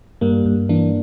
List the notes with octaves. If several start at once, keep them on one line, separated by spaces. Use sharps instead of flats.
G2 G3 A#3
G2
E3 A#3 D4